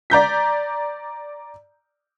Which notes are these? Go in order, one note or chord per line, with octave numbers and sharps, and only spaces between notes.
D5 A#5 G6 B6